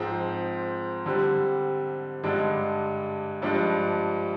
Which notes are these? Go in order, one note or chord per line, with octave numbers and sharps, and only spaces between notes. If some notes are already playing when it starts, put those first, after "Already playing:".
Already playing: G#2 F3 C4
D3 G3 C4
G2 D3 G#3 D4
G2 F3 G#3 D4